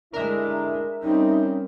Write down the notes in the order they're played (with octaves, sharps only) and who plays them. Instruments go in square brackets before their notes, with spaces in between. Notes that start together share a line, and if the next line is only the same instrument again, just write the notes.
[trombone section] D3 E4 [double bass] G#3 D4 [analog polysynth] A#4 E5
[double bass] G3 C4 [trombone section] C#4 [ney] D#4